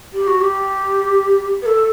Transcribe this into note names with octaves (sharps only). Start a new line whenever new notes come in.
G4
F#4
G4
B4
A4